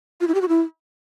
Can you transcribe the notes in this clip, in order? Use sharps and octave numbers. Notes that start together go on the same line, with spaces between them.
F4
E4
G4
F#4
E4